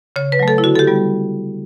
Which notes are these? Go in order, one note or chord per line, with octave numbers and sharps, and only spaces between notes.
C#3 C#5
B4
F#3 A3
A4
E4
D3 F#4
A4
G4
G3 B3